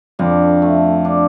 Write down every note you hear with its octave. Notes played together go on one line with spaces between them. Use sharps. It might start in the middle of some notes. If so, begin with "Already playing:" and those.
F2 D3
A3
D4